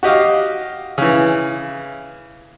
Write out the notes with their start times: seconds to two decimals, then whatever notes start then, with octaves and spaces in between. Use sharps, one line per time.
0.03 F#4 G4 D#5 F5
0.98 C#3 E3